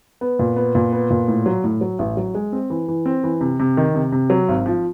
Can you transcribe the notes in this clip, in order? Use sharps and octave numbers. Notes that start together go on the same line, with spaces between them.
B3
A#2
B3
A#2
B3
A#2
A2
F#3
A2
F#3
A1
F#3
G#3
C4
E3
E3
C4
E3
C3
C3
D#3
C3
C3
F#3
G#1
F3